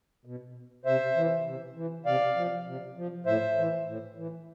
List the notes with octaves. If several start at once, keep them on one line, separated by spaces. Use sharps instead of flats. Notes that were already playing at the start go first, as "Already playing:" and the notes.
B2
C3 C5 E5
E3
C3
E3
C3 D5 F5
F3
C3
F3
A2 C5 E5
E3
A2
E3